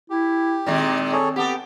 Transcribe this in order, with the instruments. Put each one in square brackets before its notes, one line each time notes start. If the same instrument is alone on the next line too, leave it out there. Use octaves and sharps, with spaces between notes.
[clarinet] E4 [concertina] G4
[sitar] A#2 D#3 G#3 [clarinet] C4
[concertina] G#4 A4 C#5
[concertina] B3 [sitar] G4 A4